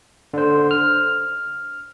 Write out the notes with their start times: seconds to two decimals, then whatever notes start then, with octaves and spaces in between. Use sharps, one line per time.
0.34 D3 C5
0.71 F6